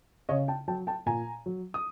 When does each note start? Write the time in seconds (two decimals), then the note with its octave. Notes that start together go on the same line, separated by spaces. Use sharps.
0.29 C#3 C#5 D#5
0.48 G5 A5
0.68 F#3 G5 A5
0.87 G5 A5
1.06 A#2 G#5 A#5
1.46 F#3
1.74 D#6